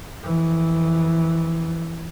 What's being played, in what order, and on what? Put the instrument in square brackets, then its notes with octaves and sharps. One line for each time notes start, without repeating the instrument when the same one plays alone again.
[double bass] F2 E3